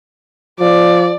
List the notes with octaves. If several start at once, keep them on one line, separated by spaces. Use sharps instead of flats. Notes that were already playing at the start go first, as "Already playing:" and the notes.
F3 D5